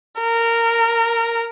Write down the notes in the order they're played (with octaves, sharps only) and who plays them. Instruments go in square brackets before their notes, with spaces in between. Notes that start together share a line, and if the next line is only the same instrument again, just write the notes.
[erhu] A#4